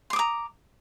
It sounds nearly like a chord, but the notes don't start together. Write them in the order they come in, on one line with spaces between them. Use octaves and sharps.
C6 D6 D#6 A#5